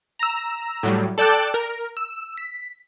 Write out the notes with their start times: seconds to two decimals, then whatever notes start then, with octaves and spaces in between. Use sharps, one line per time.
0.19 A#5 E6
0.83 A2 F#3 G3
1.18 A4 D5 G5 A5 D6 F#6
1.54 A#4
1.97 E6
2.37 B6